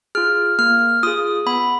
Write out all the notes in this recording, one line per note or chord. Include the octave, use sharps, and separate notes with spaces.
F4 G#4 F6
A#3 F6
F4 G#4 D#6
B3 B5